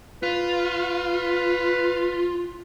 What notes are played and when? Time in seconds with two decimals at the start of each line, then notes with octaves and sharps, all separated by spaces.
0.23 F4 B4